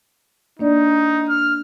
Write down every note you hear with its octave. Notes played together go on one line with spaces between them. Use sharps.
A#3 D4 D#4 D5
F6